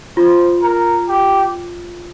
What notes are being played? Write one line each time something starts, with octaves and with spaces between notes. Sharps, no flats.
F4 C5
A#4
G4